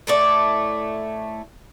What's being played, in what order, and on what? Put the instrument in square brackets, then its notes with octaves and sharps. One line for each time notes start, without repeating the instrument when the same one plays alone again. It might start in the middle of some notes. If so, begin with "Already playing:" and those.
[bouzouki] A2 A3 D5